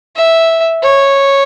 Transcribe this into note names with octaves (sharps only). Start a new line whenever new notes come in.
E5
C#5